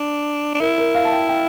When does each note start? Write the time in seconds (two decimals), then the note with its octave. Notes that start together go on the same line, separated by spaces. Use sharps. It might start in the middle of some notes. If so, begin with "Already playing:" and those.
Already playing: D4
0.54 D4
0.60 E4 A#4
0.78 A#4
0.95 F5
1.05 A5
1.12 G5
1.29 G5